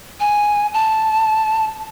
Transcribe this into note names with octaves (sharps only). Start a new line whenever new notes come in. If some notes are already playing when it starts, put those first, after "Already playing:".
G#5
A5